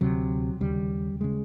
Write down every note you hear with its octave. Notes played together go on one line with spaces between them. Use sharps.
D2 C3 F#3
D#2 C#3 G3
C#3 G#3